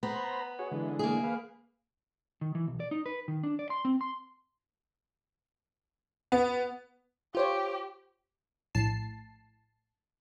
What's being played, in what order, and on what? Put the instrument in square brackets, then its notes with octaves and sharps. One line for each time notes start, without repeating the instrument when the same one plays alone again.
[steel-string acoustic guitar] B3 [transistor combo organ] C5 A#5 B5
[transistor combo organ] F#4 G#4 C#5
D3 E3 G#3
[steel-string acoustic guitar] A#3 G#4
[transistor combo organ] B4 F5
[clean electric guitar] D#3
E3
B1
D5
D#4
B4
D#3
D4
D5
C6
C4
C6
[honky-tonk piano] B3
[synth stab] F4 C5 C#5 [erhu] G4
[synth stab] A#1 A2 A5 C7